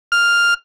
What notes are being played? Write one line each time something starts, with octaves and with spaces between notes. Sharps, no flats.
F6